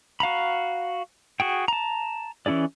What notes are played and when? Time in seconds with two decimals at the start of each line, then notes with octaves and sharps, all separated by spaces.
0.20 F#4 F5 A#5 B5
1.40 F#4 G#4 G5
1.68 A5 A#5
2.46 E3 C#4 E4 G#4 D5